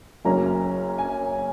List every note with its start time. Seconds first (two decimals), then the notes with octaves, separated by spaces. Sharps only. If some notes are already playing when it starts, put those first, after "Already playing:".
0.25 F#1 F#2 F#3 A#3 C#4 A#5
0.98 G#5